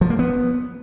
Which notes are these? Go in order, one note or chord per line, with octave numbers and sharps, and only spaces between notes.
F3
A#3
B3